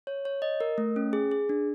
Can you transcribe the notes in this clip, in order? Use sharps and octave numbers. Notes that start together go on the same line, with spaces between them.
C#5
C#5
D#5
A#4
A3
C#4
G#4
G#4
D4